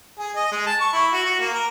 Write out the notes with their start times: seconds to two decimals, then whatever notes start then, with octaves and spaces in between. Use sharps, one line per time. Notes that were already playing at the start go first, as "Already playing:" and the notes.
0.19 G#4
0.36 D#5
0.51 G#3
0.66 A5
0.80 C#6
0.93 E4
1.13 F#4
1.26 F#4
1.40 A#3
1.53 A#4